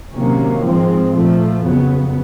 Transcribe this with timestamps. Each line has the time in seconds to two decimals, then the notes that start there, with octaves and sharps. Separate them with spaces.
0.13 C3 D#3 F#3 A#3 C#4
0.64 G#2 F3 G#3 C4
1.13 A#2 F3 A3
1.62 F2 C#3 F#3 B3